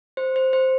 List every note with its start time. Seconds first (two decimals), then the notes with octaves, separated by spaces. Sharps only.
0.17 C5
0.36 C5
0.53 C5